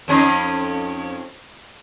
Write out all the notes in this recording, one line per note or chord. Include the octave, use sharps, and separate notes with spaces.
F2 C#4 D#4